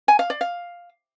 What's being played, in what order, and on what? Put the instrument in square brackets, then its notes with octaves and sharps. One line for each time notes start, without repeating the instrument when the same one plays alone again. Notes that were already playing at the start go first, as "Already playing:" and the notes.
[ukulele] G#5
F5
D5
F5